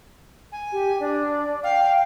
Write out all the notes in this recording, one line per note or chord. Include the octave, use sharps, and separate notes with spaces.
G#5
G4
D4 D5
F5 G5